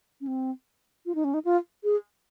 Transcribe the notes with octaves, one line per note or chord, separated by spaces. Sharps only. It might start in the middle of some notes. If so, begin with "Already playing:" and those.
C#4
C4
F4
D#4
C#4
D#4
F4
G#4